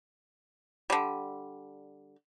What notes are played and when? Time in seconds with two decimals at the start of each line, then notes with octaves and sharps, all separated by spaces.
0.90 D3 G3